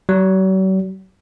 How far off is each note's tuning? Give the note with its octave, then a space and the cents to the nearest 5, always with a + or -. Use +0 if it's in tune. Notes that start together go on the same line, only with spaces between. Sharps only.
F#3 +45